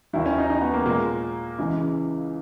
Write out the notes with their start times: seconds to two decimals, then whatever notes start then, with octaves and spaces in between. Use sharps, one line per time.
0.13 D#2 D#3 F#3 E4
0.26 C#4
0.38 D#4
0.50 D#4
0.61 B3
0.73 A#3
0.86 A#2 G#3 A#3
1.59 C#2 C#3 E3 G#3